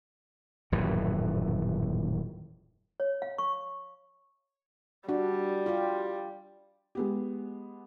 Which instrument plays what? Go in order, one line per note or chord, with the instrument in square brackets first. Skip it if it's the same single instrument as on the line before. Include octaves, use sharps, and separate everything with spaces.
[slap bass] D#1 F#2 A2 E3
[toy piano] C#5
F5
C#6
[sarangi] G3 [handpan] D4 [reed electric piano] F#4
[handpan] F4 G4
[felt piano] G#3 B3 G4